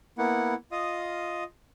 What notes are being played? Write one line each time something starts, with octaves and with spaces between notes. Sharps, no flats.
A#3 B3 E4 F#5
F4 D#5 F5 D#6